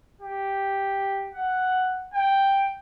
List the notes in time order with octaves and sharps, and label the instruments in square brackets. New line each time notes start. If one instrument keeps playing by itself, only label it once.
[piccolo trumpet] G4
F#5
G5